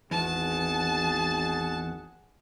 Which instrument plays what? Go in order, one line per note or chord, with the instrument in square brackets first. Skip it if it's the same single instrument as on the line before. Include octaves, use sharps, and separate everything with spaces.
[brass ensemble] G#1 G#4 F#5 [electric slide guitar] E2 [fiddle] A5